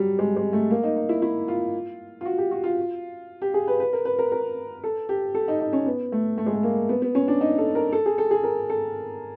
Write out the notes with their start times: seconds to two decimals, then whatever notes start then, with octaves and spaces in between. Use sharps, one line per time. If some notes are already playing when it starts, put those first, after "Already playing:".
Already playing: F#3 G3
0.19 G#3
0.36 G#3
0.53 A3
0.71 A#3
0.83 D#4
0.96 D#4
1.09 E4
1.22 E4
1.48 F4
2.21 F4
2.25 F#4
2.38 G4
2.51 F#4
2.64 F4
3.42 G4
3.54 G#4
3.68 B4
3.80 B4
3.93 A#4
4.05 B4
4.19 A#4
4.32 A#4
4.84 A4
5.09 G4
5.35 A4
5.48 D#4
5.61 D#4
5.73 C#4
5.86 B3
6.12 A3
6.38 A3
6.46 G#3
6.54 A3
6.63 A#3
6.89 B3
7.02 B3
7.15 C#4
7.28 D4
7.41 D#4
7.58 A4
7.75 A#4
7.92 A4
8.06 G#4
8.18 A4
8.31 G#4
8.44 A#4
8.70 A4